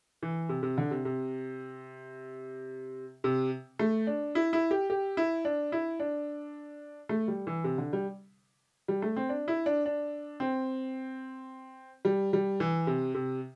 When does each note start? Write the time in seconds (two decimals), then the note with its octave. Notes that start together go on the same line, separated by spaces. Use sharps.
0.23 E3
0.49 C3
0.63 C3
0.78 D3
0.91 C3
1.05 C3
3.24 C3
3.79 A3
4.07 D4
4.35 E4
4.53 E4
4.71 G4
4.90 G4
5.17 E4
5.45 D4
5.72 E4
6.00 D4
7.09 A3
7.28 G3
7.47 E3
7.64 C3
7.78 D3
7.93 G3
8.88 G3
9.02 A3
9.16 C4
9.29 D4
9.48 E4
9.66 D4
9.86 D4
10.40 C4
12.05 G3
12.33 G3
12.60 E3
12.87 C3
13.15 C3